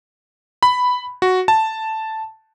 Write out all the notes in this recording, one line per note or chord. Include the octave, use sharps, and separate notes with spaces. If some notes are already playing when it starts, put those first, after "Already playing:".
B5
F#4
A5